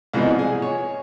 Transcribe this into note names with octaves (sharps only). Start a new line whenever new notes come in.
C2 G#2 B2 E3 F3 G#3
G#4
C#5